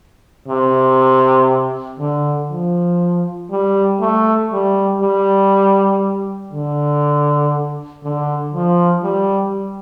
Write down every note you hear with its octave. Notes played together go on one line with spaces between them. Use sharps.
C3
D3
F3
G3
A3
G3
G3
D3
D3
F3
G3